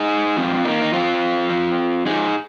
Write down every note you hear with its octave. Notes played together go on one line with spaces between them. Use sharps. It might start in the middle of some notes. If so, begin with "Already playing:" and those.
Already playing: D#4 G#4
G#2 F3 C4 F4
A#3 D#4
D#4
F2 F3 C4 F4
F2 F3
G#2 F3 D#4 G#4